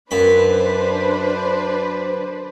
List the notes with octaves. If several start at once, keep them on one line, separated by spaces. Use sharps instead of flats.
F#2 D4 B4 C5 B5